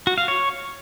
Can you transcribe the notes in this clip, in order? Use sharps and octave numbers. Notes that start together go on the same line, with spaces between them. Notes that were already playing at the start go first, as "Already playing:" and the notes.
F#4
F5
C#5